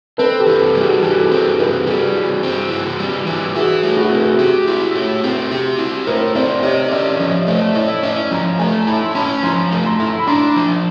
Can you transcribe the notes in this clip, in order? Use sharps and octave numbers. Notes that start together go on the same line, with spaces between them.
C4 A4 B4
G4 A4
E3
G3
F#4 G#4
E3 G4 A4
C4 G#4 A#4
E3 A4 B4
G3 F#4 G#4
E3
C4
E3
G3
E3
E4 F#4 G#4
A3
F#4 G#4
C4
G4
E4
A3
C4
G4
E4
A3 A#4 C5
C4 C5 D5
G4 C#5 D#5
C#4 D5 E5
F3 C#5 D#5
A3 C5 D5
E4 C#5 D#5
C#4 D5 E5
F3 G#5 A#5
A3 G#5 A#5
E4 A5 B5
C6
C#4 A5 B5
F3 A#5 C6
A3
A#5 C6
E4
B5
D4 A#5 C6
F3